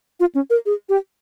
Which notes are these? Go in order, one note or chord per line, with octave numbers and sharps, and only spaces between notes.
F4
C#4
A#4
G#4
G4